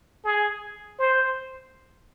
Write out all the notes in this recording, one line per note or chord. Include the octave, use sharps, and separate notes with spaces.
G#4
C5